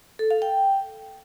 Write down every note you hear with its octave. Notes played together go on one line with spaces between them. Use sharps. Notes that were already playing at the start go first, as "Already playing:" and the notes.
A4
F5
G5